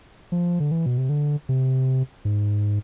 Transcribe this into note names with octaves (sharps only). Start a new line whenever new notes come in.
F3
D3
E3
B2
C3
D3
C3
G#2